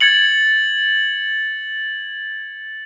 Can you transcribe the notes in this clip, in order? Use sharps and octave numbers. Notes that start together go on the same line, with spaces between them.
G#6 A6 C#7 F#7